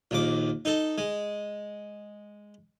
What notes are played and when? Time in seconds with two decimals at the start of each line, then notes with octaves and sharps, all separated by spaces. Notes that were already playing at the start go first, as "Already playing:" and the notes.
0.11 A#1 D#2 D6
0.65 D#4 A4
0.98 G#3